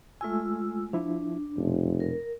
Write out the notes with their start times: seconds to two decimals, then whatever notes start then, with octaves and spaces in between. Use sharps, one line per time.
0.21 G#3 A3 F4 G#5 E6
0.93 F3 D4 E4
1.57 F1 F2 B2 F3
2.00 A#4